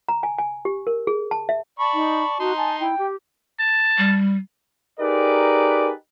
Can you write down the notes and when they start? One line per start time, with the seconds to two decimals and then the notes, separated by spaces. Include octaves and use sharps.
0.09 A#5
0.23 G#5
0.38 G#5
0.65 G4
0.87 A#4
1.07 G#4
1.31 A5
1.49 E5
1.79 D5 A5 B5 C#6
1.94 D#4
2.40 D#4 F#4 C6
2.57 G#5 A5
2.80 E4 G5
2.98 G4
3.60 A5
3.98 G3
5.00 D#4 G4 G#4 A#4 B4 D5